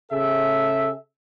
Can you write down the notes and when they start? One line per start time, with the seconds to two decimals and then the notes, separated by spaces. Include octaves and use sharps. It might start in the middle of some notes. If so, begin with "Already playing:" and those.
0.12 C#3 G#4 A4 E5